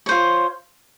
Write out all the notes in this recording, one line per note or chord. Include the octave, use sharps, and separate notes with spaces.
F4 C5 C#5